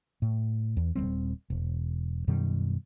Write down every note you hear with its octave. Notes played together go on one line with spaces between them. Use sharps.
A2
E2
D#1 D#2 G3 C4
E1
F#2 B2 D#3 G3